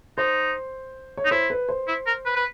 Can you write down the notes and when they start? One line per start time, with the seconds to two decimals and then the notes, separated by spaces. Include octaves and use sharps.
0.18 D#4 C5
1.17 C#5
1.25 D#4
1.31 E4 C5
1.50 B4
1.69 C5
1.88 E4
2.07 A#4
2.26 B4
2.36 B4